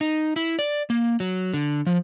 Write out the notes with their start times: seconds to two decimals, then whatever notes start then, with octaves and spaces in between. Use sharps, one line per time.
0.01 D#4
0.36 E4
0.59 D5
0.90 A#3
1.20 F#3
1.53 D3
1.86 F3